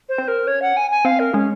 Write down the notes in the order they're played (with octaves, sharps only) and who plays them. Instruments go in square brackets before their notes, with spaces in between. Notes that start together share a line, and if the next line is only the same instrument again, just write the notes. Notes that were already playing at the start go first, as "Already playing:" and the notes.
[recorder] C5
[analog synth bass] C4
[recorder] A#4
[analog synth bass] C#4 [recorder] C#5
[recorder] F#5
G#5
G#5
[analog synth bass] C4 [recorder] F5
[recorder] A#4
[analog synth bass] G#3 [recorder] C#4